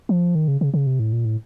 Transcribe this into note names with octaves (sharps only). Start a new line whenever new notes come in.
F3
D#3
C#3
C#3
C#3
C3
A2
A#2
A2